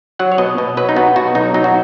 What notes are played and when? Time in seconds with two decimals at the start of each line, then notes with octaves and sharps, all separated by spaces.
0.19 F#3 F#5
0.32 C#5
0.38 B2 D#5
0.58 B2
0.77 F#3 B4
0.89 D#4
0.96 B3 F#4
1.16 B2 F#4
1.35 B1 D#4
1.54 F#3 D#4
1.64 F#4